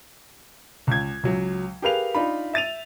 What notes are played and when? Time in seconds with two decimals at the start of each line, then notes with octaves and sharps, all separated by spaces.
0.87 C#2 G#6
1.23 C#2 F#3
1.82 G4 G#4 A#4 B4 F5 F7
2.15 D4 D#4 F4 B5
2.54 E5 A6 D#7 F7